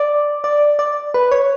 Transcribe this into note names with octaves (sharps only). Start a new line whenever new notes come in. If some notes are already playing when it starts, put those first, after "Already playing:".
Already playing: D5
D5
D5
B4
C#5